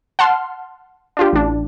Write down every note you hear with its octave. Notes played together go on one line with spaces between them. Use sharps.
F#5 A5 C6 F6
D4 F4 G4
A1 D4